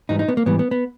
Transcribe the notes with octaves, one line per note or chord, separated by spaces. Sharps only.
G#2 E3 G3 D#4
D#4
B3
A#3
G#2 E3 G3 B3
B3
B3